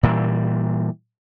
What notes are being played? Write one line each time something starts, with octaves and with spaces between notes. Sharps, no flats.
A#2 E3 G3